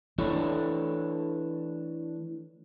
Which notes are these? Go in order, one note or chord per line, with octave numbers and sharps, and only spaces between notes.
E3 A3 D4 C#5